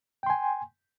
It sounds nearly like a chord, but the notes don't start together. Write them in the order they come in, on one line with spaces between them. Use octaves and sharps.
G5 C6 G#5